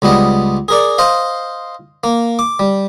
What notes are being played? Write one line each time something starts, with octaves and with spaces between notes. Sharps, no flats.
C#2 G3 B3 D#5
G#4 A#4 D5
C5 D#5 F5
A#3
D6
G3